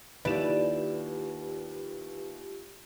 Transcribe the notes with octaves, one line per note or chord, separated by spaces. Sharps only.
D#2 E4 F4 G4 B4 D5 E7